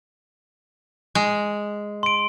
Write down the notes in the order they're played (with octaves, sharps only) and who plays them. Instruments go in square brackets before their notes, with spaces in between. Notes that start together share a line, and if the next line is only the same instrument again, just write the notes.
[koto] G#3
[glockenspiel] C6 D7